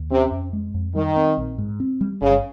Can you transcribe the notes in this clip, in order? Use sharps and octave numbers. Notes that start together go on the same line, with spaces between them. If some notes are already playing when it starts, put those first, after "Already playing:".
Already playing: D#2
C3 C#4
F2
G#3
F2
D#3 G3
C4
A#1
G#2
C4
G3
G1 C#3